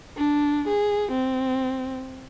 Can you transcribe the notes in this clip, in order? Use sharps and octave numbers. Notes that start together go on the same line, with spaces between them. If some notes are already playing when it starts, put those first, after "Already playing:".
D4
G#4
C4